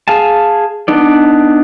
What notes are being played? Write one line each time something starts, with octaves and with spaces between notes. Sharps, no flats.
G#4 F5 G#5 A5
B3 D4 D#4 D5